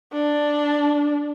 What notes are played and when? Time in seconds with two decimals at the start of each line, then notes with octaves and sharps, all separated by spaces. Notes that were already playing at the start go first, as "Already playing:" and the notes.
0.13 D4